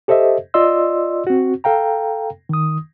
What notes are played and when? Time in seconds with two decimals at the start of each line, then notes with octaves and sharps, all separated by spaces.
0.08 G4 A4 C5 D#5 E5
0.54 F4 D5 D#5 C6 E6
1.27 C4 F#4
1.64 A4 F5 G5 A#5
2.49 D#3 D#6